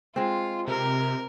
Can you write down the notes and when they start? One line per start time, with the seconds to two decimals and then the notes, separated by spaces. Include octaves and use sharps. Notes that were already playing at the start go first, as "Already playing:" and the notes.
0.16 G#3 C4 F4
0.67 C3 A#4